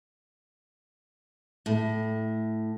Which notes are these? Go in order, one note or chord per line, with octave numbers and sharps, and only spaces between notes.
A2